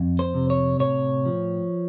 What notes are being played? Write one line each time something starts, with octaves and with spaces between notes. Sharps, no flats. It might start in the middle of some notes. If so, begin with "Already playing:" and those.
Already playing: F2
C5
C3
C#5
A2 C#5
F3